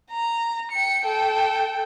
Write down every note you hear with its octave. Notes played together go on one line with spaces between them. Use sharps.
A#5
G5 C#7
A4 G5